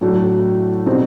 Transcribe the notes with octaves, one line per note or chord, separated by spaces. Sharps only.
A2 F#3 A3 D4 F#4
B2 G3 C4 D#4